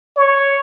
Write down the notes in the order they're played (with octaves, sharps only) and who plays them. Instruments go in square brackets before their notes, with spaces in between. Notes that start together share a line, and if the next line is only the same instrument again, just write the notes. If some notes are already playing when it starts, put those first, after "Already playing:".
[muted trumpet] C#5